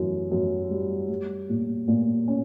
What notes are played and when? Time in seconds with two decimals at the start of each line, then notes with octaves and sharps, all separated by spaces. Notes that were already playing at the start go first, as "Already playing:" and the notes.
Already playing: F#2 E3
0.31 F#2
0.70 G3
1.09 G3
1.49 A#2
1.88 A#2
2.28 C#4